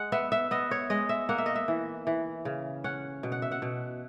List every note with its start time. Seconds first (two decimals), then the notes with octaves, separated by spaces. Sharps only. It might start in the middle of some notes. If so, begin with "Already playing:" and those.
Already playing: G#3 F#5
0.12 B3 E5
0.32 E5
0.51 B3 D#5
0.71 C#5
0.90 G#3 D#5
1.09 E5
1.29 A#3 F#5
1.38 E5
1.46 D#5
1.55 E5
1.68 E3
2.07 E3
2.45 C#3
2.84 C#4 F#5
3.23 B2
3.32 F#5
3.42 E5
3.51 F#5
3.62 B2